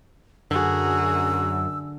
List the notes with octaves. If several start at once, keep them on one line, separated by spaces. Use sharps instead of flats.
F#2 D3 F#4 G#4 A#4 E6